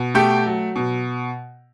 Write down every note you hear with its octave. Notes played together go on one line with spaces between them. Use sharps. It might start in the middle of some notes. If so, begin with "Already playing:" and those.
Already playing: B2
A3 G4 G5
F#3
B2